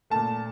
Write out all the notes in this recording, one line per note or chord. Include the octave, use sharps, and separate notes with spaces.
A#2 A3 A5